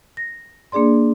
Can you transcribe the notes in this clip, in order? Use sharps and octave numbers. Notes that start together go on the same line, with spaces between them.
A#6
A#3 D4 G#4 D5 C6